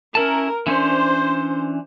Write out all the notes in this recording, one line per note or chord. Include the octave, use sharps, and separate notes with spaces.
C#4 E4 A#4 A5
E3 C#4 D4 C5